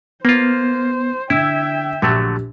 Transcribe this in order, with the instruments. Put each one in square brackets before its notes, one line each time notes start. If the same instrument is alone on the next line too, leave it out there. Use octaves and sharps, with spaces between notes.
[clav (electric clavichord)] A#3 F4 [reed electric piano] B3 [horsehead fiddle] C5
[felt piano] D3 [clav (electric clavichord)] E4 [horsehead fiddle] E5 G5 [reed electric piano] E6 G#6
[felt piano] A#1 G4 [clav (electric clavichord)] D3 F#3 A3